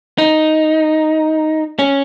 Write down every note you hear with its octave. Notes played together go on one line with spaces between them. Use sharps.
D#4
C#4